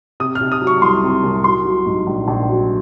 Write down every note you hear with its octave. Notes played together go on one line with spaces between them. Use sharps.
C3 D#6
F6
C3
D#6
F#3
C#6
C2 C6
C3
C2
F#3 C6
F#3
G#2
A#1
A#1
F#3